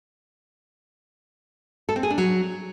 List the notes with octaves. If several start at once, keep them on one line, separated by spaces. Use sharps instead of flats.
A4
C4
G#4
D4
F#3